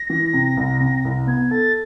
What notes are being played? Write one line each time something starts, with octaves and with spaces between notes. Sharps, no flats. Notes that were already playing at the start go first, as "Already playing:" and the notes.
Already playing: A#6
E3
C3
C2
C3
C2
B3 G#6
A4 A6